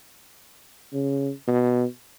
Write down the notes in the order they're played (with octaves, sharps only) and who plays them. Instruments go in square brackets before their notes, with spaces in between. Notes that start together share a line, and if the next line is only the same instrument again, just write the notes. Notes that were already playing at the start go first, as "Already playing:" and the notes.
[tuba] C#3
B2